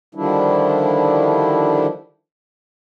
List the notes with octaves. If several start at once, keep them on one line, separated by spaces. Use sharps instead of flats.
D3 D#3 F3 G3 D4 E4